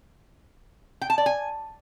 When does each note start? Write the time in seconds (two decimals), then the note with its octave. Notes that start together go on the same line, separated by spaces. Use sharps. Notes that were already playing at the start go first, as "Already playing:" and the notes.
1.01 G5
1.10 A5
1.18 D5
1.26 G#5